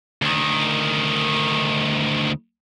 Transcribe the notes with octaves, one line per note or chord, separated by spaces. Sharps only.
D2 D#3